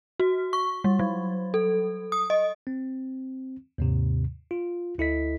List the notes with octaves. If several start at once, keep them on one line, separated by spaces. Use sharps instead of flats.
F#4
C#6
G3
F#3
A4
D#6
D#5
C4
D#2 G#2 C3
F4
D2 E4 A4 D#5 B6